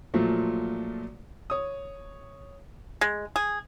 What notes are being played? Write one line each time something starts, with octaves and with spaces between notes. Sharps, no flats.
A#2 F3 F#3 A3
C#5 D#6
G#3
G#4